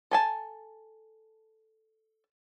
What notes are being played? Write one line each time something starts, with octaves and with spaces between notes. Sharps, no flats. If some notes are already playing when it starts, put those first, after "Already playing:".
A4 G#5 A5